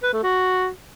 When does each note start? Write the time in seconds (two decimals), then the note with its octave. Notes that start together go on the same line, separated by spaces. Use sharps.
0.03 B4
0.13 A3
0.23 F#4